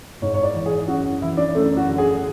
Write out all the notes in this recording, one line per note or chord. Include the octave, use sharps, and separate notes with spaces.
G#2 C#5
C#5
D5
E3
G#4
F#2 F#4
E3 E4
D4
F#2 A3
F#4
D3
G#4